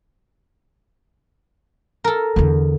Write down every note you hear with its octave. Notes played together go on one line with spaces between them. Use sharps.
A4 A#4
E2 D3